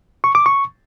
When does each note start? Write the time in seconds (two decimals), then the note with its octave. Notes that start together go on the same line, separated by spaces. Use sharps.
0.24 C#6
0.35 D6
0.46 C#6